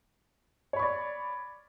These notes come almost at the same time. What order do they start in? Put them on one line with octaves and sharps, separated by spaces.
C#5 B5 C#6 D5